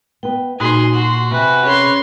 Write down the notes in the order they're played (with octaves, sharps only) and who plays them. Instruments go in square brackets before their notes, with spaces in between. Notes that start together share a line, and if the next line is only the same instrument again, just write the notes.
[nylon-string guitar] B3 B4 [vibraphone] G5
[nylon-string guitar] A#2 [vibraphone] D#4 F#4 [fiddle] G#4 [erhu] C6
[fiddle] F#4 [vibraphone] F#5
[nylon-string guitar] C3 [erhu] B4 [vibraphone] G#5
[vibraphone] C#4 G#4 A#4 [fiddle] C#5 C6